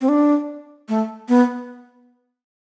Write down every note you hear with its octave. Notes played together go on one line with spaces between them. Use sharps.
C4
D4
A3
B3